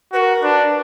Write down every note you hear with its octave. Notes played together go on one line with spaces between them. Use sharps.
F#4 A#4 B4
D4 B4